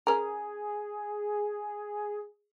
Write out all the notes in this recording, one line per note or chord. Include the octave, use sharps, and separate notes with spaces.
C#4 G#4 A#4